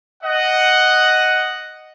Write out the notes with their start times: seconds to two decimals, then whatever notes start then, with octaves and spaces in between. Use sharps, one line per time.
0.23 D#5 F#5